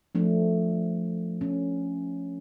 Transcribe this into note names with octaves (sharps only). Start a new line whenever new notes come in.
F3 A3 D4
C#4